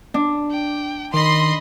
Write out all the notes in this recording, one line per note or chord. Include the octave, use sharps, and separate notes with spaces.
D4
G5
D#3 D#5 B5 C6